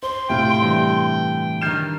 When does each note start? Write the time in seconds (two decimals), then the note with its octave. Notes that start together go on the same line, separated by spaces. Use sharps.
0.03 C5 C6
0.30 A2 C3 E4 F4 G5
0.61 G2 E3
1.62 D#3 D4 F6 G6 C7 E7